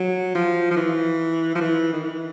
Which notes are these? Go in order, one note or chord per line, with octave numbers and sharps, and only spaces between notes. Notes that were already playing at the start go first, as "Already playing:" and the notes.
Already playing: F#3
F3
F3
E3
F3
E3
D#3
E3